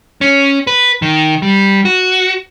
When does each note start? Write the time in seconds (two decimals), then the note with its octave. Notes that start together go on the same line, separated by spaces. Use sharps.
0.21 C#4
0.67 B4
1.02 D#3
1.42 G3
1.85 F#4